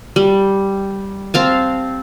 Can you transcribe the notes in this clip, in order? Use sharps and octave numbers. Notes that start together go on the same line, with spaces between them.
G3
C4 F5 A5